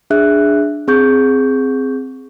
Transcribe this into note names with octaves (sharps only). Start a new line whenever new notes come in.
D4 G#4 E5 F#6
C4 G#4 C#6 G6